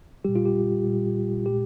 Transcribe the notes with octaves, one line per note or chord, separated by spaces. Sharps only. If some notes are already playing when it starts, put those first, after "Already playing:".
A#2 G3 G4
F4
G4
A#2 G3
A#2 G#3 G4